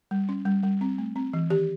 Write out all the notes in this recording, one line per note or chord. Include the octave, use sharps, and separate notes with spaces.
G3
C#4
G3
G3
C4
A3
C4
E3
D#3 G4